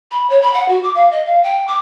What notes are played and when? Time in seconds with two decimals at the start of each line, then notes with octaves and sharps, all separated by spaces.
0.11 B5
0.30 C#5
0.42 B5
0.54 F#5
0.68 F#4
0.83 D6
0.95 F5
1.11 D#5
1.26 F5
1.43 G5
1.67 D6